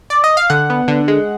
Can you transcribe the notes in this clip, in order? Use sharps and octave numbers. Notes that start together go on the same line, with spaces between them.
D5
D#5
F5
D3 F#5
B3
D3
G#3